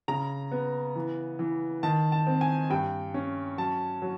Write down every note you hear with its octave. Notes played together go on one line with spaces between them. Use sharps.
C#3 A#5
B3
E3
E3
D#3 A5
A5
C4
G#5
G2 G5
C#4
F#3 A5
F#3